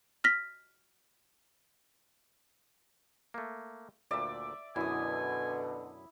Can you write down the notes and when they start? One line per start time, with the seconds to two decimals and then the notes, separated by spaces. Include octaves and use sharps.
0.24 F6 A#6 B6
3.34 A3 A#3
4.11 D2 A#2 D5 E5
4.76 F#2 B2 D3 E4 G#5 D#6